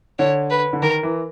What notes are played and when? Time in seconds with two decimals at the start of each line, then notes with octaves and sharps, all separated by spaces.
0.19 D3 C#5
0.50 B4
0.73 D3
0.82 D#3 A#4
1.03 E3